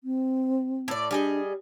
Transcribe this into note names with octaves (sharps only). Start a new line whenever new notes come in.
C4
A2 D5
G3 D4 G#4 D#5